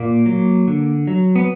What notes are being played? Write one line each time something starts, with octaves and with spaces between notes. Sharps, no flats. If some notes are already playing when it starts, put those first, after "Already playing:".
Already playing: A#2 A#3
F#3
D3
F#3
B3